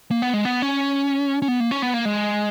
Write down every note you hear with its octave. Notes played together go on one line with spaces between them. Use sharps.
A#3
B3
G#3
B3
C#4
C#4
B3
A#3
C#4
B3
A#3
G#3